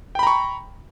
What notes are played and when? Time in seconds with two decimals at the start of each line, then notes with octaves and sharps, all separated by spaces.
0.15 G5
0.19 B5
0.23 A#5
0.27 C#6